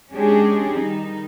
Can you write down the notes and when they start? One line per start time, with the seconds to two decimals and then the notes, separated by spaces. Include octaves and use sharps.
0.11 G#3 C#4 D4 G4 G#4
0.77 D#3 G3 D#4